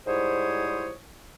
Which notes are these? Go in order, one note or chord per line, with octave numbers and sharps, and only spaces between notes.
G#2 G3 E4 C5 C#5 D#6